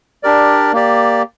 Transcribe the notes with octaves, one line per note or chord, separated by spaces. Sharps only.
D4 G4 A#4 D5
A#3 G4 D5